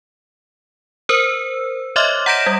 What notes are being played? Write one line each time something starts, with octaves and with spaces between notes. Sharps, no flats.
A#4 C5 E6
C#5 D#5 E5 C6 D6 F6
F#5 A#5 G6 A#6 D7 E7
G3